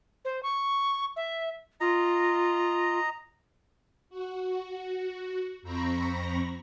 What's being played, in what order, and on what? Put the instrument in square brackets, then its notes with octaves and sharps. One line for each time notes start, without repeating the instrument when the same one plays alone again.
[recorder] C5
C#6
E5
[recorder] F4 [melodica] D#5 A#5
[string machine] F#4
F2 C4 A#5 B5 C#6 A#6